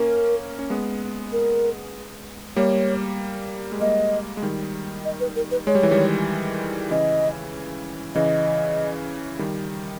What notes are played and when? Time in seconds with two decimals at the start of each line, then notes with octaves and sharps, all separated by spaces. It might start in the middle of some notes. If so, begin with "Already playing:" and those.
Already playing: A#3 C#4 A#4
0.59 C#4
0.70 G#3 B3
1.32 A#4
2.56 G3 A#3 C#5
3.72 G#3
3.81 G3 A#3 D#5
4.37 G#3
4.43 D#3 G3
5.05 D#5
5.20 B4
5.36 A#4
5.51 B4
5.67 G#3 C#5
5.75 G3
5.83 E3
5.91 D#3 G3
6.91 C#3 E3 D#5
8.15 C#3 E3 D#5
9.39 D#3 G3